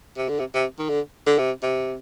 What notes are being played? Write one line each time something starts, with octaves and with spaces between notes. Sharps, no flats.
C3
D3
C3
C3
D#3
D3
D3
C3
C3